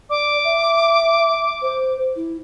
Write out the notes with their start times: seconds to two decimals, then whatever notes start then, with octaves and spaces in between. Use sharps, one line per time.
0.10 D5 D6
0.44 E5
1.62 C5
2.16 E4